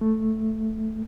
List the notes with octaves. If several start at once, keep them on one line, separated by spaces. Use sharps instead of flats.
A3